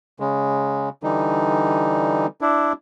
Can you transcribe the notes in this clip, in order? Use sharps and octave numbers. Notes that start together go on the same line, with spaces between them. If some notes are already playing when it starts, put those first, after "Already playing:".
C#3 G#3
D3 E3 G3 D#4
D4 E4